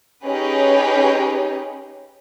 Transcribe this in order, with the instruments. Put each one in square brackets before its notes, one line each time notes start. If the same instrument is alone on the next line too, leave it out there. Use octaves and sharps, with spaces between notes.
[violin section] C#4 D#4 G4 G#4 B4 C#5